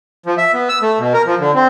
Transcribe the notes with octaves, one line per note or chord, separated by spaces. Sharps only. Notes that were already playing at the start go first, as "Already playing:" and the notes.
F3
E5
B3
E6
A3
B2
A#4
F3
D3
C4